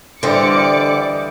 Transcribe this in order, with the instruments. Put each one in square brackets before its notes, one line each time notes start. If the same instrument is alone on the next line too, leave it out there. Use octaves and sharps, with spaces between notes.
[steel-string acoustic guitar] D3 C5 [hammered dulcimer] E3 G3 D#5 [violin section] D5 D6 C#7